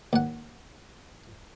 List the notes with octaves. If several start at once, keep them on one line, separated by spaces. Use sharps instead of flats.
D#2 F#5